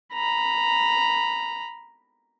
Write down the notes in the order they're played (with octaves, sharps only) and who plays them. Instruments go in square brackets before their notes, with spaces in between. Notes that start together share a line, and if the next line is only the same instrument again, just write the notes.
[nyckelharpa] A#5 B5